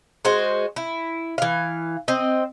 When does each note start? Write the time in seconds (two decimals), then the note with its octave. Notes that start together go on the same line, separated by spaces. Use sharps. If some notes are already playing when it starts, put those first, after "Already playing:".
0.25 G#3 F#4 C5
0.76 E4
1.38 E3 F5
2.08 C4 D#5